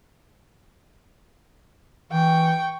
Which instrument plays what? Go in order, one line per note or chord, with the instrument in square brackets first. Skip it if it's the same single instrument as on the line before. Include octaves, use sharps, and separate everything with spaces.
[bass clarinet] E3 [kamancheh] G5 C#6